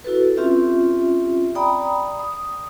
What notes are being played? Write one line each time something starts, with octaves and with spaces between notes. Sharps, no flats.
E4 F#4 A4 B4
C4 C#4 F4 G4 E5
D5 G5 A#5 B5 D#6
D#6